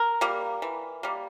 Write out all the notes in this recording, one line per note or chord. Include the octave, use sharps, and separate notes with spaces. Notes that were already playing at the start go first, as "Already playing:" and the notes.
Already playing: A#4
G3 A#3
E3
G3 A#3